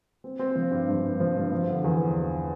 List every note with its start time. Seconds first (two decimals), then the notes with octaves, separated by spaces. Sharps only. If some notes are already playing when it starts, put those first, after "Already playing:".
0.24 C4
0.39 C4
0.55 F3
0.71 G2
0.88 G2
1.04 G2
1.20 F3
1.36 G2
1.52 F3
1.68 D3
1.84 E2